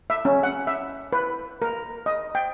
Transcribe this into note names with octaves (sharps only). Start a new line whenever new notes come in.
E5
C#4
F#5
E5
B4
A#4
D#5
G5